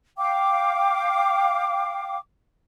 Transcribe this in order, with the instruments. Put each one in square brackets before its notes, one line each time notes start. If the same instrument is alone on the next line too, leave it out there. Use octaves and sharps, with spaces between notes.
[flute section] F5 G5 D6